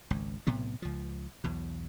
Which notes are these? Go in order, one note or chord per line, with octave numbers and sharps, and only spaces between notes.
G#1 C#2
B1 A2 C3 B3
C#2 F3
B1 E2 B2